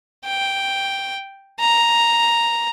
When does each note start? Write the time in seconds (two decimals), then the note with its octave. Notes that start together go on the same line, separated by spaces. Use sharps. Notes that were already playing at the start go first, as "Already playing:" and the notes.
0.25 G5
1.59 A#5